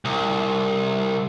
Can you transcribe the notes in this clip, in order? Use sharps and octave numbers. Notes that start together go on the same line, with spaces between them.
C2